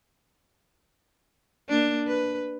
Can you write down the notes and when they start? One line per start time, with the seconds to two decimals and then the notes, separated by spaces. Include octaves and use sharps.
1.69 A#3 D4
2.07 B4